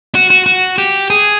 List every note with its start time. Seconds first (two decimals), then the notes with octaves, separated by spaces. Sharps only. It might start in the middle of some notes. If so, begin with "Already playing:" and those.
0.15 F#4
0.30 F#4
0.46 F#4
0.78 G4
1.10 G#4